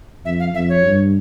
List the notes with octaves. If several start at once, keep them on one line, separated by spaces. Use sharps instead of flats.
F2 E5
F5
F2 E5
C#5
G2